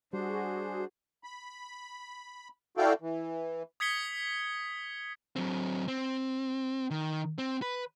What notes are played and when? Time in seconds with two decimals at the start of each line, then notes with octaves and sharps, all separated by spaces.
0.13 G3 D4 F#4 G#4 C5
1.24 B5
2.77 E4 F#4 A4 D5 F5 G5
3.01 E3
3.80 D#6 G#6 B6 C#7 G7
5.36 F#3 C4
5.88 C4
6.91 D#3
7.38 C4
7.62 B4